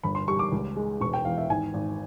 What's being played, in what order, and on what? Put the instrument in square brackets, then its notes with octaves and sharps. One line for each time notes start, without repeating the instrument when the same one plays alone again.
[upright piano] G1 B5
C6
G3 C#6
D6
C#2
G#3
E1 C#6
G5
E2 F5
E5
G#1 G#5
G#1